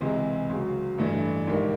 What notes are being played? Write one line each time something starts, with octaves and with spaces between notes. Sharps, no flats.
C#2 C3 E3 G#3
C#2 C#3 F#3
A1 G2 E3 A3 D4
A#1 G#2 D#3 G3 A#3